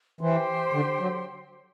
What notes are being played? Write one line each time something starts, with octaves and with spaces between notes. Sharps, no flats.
E3 G4 C5 G5 C6
D3
F#3